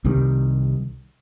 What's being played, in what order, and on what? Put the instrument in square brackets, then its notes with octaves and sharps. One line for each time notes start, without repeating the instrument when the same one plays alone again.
[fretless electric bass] C2 C3 D#3 G3